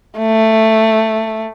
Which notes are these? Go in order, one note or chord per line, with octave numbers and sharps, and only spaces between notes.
A3